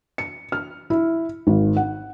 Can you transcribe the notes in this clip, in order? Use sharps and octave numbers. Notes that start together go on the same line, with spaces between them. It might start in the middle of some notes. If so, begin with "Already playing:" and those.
C#7
F6
E4
G#1
F#5